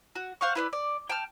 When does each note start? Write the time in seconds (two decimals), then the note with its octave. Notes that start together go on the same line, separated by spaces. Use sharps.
0.15 F#4
0.41 C5 F5 F#5 C#6
0.55 E4 B4 C5 D5
0.73 D5
1.10 G5 A5 F6